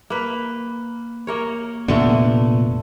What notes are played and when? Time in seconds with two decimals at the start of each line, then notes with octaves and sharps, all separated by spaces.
0.10 A#3 B4
1.27 A#3 A#4 C#5
1.88 F1 A#2 D3 A3 B3